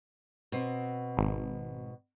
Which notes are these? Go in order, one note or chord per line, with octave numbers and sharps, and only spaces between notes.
B2 C4
G#1